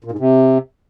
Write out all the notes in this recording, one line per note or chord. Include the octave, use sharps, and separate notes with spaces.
A#2
G#2
C3